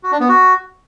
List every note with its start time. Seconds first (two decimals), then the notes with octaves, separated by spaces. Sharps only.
0.03 F#4
0.12 D4
0.20 B3
0.29 F#4